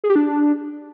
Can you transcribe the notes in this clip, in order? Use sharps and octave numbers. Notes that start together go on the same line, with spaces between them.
G#4
G4
D4